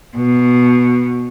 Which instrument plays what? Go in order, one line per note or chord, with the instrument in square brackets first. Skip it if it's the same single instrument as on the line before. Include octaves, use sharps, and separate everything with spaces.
[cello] B2